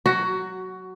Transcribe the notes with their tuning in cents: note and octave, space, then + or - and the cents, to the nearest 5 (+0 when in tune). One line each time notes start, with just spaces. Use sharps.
F#3 +0 F#4 +15